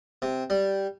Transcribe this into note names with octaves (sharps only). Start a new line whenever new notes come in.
C3
G3